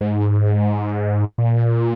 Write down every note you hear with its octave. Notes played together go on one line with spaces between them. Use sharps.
G#2
A#2